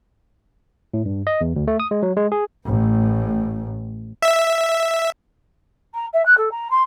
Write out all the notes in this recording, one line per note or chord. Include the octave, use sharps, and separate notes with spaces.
A2
G2
D#5
E2
D2
A3
D#6
G#3
F#3
G#3
G#4
A1 A2
E5
A#5
E5
F#6
A4
A#5
C6